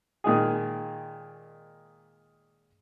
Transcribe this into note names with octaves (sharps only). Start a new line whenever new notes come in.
A#2 D#3 G#3 G#4